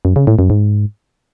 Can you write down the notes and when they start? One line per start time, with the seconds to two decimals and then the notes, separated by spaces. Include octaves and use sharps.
0.05 F#2
0.16 C#3
0.27 A2
0.39 F#2
0.50 G#2